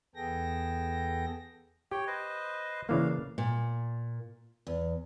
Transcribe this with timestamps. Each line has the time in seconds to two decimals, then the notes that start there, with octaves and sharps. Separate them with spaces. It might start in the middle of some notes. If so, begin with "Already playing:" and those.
0.15 E2 B3 G#4 A4 G5 A#6
1.91 G4 C#5 G5
2.07 B4 C5 D#5
2.89 C#3 E3 A#3 D4 F5
3.38 A#2
4.67 E2